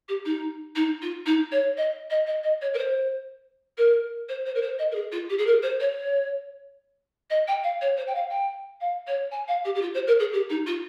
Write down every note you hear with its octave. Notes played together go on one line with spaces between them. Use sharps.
G4
D#4
D#4
F4
D#4
C#5
D#5
D#5
D#5
D#5
C#5
A#4
C5
A#4
C5
C5
A#4
C5
D#5
A#4
G#4
F4
G4
G#4
A#4
C5
C#5
D#5
G5
F5
C#5
C5
G5
F5
G5
F5
C#5
G#5
F5
G4
G4
F4
C5
A#4
G#4
G4
D#4
F4